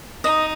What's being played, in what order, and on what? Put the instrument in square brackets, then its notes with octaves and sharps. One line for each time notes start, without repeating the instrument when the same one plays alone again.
[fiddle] D#4 [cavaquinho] D#5